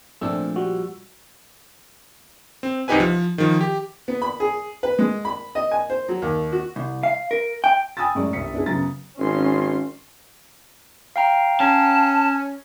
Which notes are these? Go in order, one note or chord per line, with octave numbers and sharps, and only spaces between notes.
A#2 F3 A3 C4 D4 E6
G3 F#4
C4
C2 C4 D#4 G4 B4 G#5
F3
D#3 F3
G4
B3
B5
G#4
B4
G#3
B5
D#5
G#5
C5
F#3
D#2
F#4
C2
F5
A#4
G5
G5 G#5 B5 D#6 E6 A6
F#2 A2 G#3 D5 C#6
G1 C2 G2 B6 C#7
B3 D4 E4 G#4
F#2 C#3 F#3 B3 A#5 A6
G#1 C#4 C6
F5 G5 A#5
C#4 A5